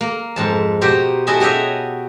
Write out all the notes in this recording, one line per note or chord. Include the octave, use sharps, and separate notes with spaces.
A#3
F2 G#2 A5
B2 G4 C5 A#5
E4 F#4 G#4 A4 D#5 E5
F#4 G4 C#5 D#5 E5